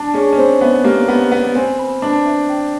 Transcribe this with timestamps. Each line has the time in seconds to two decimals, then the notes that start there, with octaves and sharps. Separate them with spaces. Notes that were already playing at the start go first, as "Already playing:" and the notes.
Already playing: D4 A5
0.14 C#4 G#4
0.33 C#4
0.38 C4 C5
0.61 B3 E5
0.84 A#3 G4
1.08 B3 G4
1.32 B3 B4
1.55 C4 G#5
1.79 B5
2.02 D4 B4
2.25 E5
2.49 G5